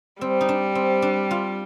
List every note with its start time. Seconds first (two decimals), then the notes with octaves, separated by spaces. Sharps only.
0.21 G3 C4
0.41 D#4
0.49 D4
0.75 C4
1.02 D4
1.31 F4